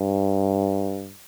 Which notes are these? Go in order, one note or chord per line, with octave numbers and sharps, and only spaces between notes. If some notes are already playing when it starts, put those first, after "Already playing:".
Already playing: G2